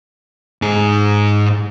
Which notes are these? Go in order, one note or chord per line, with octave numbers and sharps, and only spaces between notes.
G#2 G#4